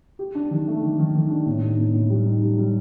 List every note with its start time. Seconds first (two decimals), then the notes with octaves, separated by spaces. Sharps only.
0.19 G4
0.35 D4
0.51 D#3
0.67 A3
0.83 D#3
0.98 D#3
1.15 D#3
1.30 D4
1.46 A2
1.62 D#4
1.79 A2
1.94 A2
2.10 G3
2.26 D#4
2.42 G3
2.58 G3